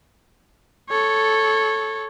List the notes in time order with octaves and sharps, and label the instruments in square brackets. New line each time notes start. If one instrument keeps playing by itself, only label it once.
[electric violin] A4 C#5